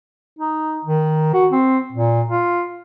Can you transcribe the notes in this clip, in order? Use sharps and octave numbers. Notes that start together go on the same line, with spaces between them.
D#4
D#3
F#4
C4
A#2
F4